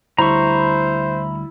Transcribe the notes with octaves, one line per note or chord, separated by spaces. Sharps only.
D2 G3 E4 C5 A#5 C#6